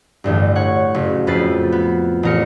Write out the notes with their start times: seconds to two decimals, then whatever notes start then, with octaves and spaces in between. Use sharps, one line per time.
0.24 A1 D2 G2
0.56 C#5 F#5
0.94 F#1
1.27 F2 A3 B4 A6 C7
1.72 B3
2.23 A1 A#4 C#7